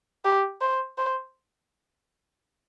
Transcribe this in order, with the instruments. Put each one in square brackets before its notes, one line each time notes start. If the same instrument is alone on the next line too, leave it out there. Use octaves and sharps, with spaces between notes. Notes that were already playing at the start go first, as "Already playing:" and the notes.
[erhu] G4
C5
C5